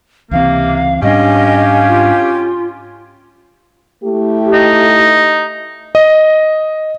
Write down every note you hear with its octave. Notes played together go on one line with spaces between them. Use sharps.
C#2 C3 E3 A#3 C4 F5
G#2 G3 C#4 D4 G4 D#5 F5 G#5
F4
A3 E4 G4
D#4
D#5